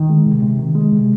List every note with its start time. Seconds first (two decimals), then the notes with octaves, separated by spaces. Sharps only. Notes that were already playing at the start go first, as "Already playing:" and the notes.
Already playing: D#3
0.10 G#3
0.26 C3
0.43 C3
0.59 D#3
0.75 G#3
0.92 C3